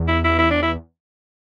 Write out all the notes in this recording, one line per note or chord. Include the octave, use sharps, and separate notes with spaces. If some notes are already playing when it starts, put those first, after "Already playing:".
Already playing: E2
E4
E4
E4
D4
E4